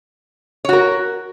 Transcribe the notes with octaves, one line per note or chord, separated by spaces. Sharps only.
F#4 A#4 C#5